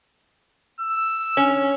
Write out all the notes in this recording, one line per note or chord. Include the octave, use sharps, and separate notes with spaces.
E6
C#4